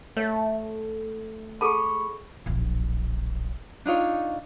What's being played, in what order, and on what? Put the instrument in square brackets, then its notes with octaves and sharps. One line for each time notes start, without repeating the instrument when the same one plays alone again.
[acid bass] A3 [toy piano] C#5
[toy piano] G#4 A4 A5 [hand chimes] B5 C#6
[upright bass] D1 A#1
[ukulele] D4 D#4 F4 C#5